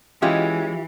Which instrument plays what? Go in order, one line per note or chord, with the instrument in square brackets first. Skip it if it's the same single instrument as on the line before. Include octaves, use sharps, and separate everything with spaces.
[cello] E3 [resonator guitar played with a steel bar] G#3 C#4 [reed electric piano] F4 G4 E5